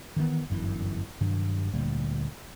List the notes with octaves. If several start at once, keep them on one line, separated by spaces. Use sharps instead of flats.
D#3 E3 A#3 B3
G1 F#2 B2 E3
G2 C3 D#3 F#3
D2 A#2 G3 A#3